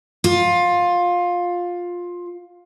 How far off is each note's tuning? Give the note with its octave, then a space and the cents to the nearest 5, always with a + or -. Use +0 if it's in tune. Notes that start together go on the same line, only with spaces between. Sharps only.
F4 +15